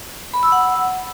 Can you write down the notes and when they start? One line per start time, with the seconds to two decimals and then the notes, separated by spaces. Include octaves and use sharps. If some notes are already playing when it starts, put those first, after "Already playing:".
0.34 B5
0.43 E6
0.52 F#5